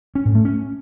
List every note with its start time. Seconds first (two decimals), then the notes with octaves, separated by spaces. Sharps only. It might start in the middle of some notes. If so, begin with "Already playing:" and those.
0.15 C#4
0.25 A2
0.35 A3
0.45 C#4